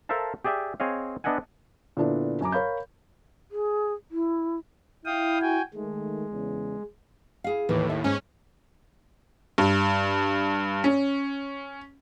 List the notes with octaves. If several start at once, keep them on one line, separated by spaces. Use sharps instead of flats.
A4 A#4 C5 E5 F5 A5
G4 G#4 D5 E5 G5
C4 G#4 C#5 D#5 F5
B3 D4 D#5 E5 F#5 G#5
A#2 D3 B3 D4 E4 A4
F#2 G#5 A#5 D6
A#4 C#5 F5 B5 G6
G#4
E4
E4 F5 G5 D#6
F#4 G5 G#5
D#3 G#3 A3
E2 C#3
E4 G#4 F5
D#2 A2 E3
E5
G#2 C#4
G2
C#4